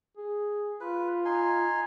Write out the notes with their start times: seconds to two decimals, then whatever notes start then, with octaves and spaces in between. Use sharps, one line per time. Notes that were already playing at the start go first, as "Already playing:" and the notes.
0.17 G#4
0.81 F4 B4
1.25 D#4 G#5 C6